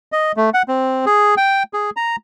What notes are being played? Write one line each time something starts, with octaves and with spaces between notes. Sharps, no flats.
D#5
A3
F#5
C4
G#4
G5
G#4
A#5